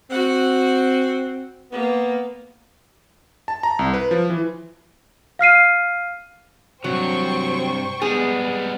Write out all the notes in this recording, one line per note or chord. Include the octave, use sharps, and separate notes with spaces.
C4 F#4 F#5
A#3 B3
A5
A#5
C2
B4
F3
E3
F5 F6 C7 D#7
G2 C3 F#3 C5 G5 C#6
G3 G#3 B3 G#4